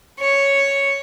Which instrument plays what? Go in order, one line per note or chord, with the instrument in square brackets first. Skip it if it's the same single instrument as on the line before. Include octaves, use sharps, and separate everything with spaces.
[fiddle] C#5